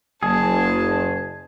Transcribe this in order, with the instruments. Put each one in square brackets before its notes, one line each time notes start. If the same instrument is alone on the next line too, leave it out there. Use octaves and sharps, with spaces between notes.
[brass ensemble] F#1 [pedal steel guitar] G#4 [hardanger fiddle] A5